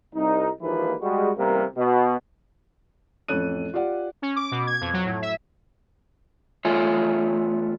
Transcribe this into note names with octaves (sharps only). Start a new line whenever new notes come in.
C2 D#4
D#2 G#2 E3 F3 A#3 B4
G3 G#3 F#4
A1 C3 G3 A#3 A#4
B2
A1 F2 A4 C#5 F#6 D#7
F4 G4 D5 F#5
C#4
D6
B2
G#6
F2
F#3
A2
E5
E2 A3 F4 C#5 E5 G#5